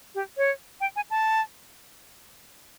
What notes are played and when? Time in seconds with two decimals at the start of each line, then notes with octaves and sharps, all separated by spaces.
0.15 G4
0.37 C#5
0.81 G5
0.96 G#5
1.10 A5